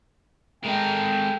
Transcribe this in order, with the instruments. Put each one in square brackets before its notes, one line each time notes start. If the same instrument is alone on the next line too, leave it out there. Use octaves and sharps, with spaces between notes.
[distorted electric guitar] G#3 A#4 [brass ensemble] A4 G5